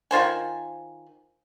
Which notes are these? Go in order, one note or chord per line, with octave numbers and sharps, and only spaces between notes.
D#3 F4 C5 G#5